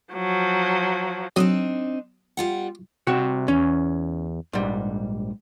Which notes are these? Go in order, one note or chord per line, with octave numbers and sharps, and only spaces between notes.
F3 F#3
F#3 C4 D4 D#4 D#6
G3 F4 F#5
C2 C3 F#4 G5
E2 C#4
A#1 G#2 G3